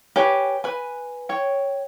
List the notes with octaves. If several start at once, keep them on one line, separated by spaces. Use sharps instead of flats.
G4 B4 C#5 G#5
B4 G#5
C#5 G5